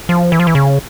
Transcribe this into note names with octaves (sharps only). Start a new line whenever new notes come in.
F3
E3
F3
E3
C#3